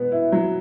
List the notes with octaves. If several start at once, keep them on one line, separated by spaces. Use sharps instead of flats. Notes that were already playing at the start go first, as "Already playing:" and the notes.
Already playing: B2 B3
E4
F#3